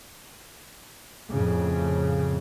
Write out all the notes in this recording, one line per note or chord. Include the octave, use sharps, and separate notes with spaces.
F2 A2 C#3